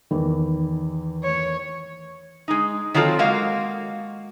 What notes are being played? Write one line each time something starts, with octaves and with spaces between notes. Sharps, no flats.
E2 D#3 E3
C#5
G#3 D#4
D#3 F#3 C4 F4 A4
G#3 A#3 F#4 F5